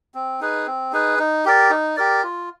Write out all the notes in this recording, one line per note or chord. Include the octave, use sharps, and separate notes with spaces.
C4
D#4 G#4 B4
C4
D#4 G#4 B4
D#4
G4 A#4 D5
D#4
G4 A#4 D5
F4